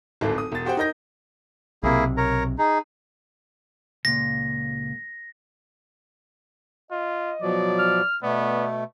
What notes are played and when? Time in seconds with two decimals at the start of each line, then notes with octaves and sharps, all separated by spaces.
0.21 D1 G#1 A4
0.38 D#6
0.52 E1 A6
0.65 F#4 G4 C5 F#5 G5
0.77 D#4 A#4 D#5 G6 A#6
1.83 B1 C3 A#3 E4 G#4
2.17 A#4 C#5 A#5
2.58 D#4 G#4
4.05 C#2 A#2 A#6
6.91 F4 D#5
7.42 B2 F3 F#3 D5
7.79 F6
8.23 B2 A3 B3 D5